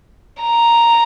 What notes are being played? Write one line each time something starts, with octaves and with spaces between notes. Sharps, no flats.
A#5